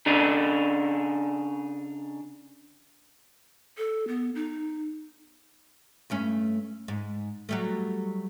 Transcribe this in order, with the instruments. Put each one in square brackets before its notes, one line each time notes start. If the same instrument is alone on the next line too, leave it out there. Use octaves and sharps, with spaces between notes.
[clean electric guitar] C#3 D4 D#4
[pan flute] A4
B3
D#4
[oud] G2 A3 C#4
G#2
F#3 G3 A3